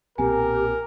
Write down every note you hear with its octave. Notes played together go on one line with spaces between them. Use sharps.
B1 A#2 C4 G4 A#4 G#5